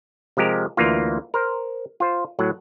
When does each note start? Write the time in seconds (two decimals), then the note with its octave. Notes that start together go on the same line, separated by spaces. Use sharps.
0.37 C3 F3 G#3 G4 A#4
0.77 D2 E3 A#3 F4
1.34 A#4 C5
2.00 F4 C5
2.39 A2 F#3 F#5